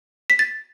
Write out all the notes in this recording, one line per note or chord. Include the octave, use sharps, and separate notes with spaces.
B6
A6